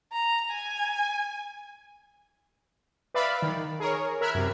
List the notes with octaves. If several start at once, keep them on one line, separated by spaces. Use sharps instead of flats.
A#5
G#5
B4 D5 E5 F5 B5
D#3
G#4 A#4 C#5
A#4 E5 B5 F6 F#6 G#6
F#2 C3